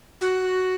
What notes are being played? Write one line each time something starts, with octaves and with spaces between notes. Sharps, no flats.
F#4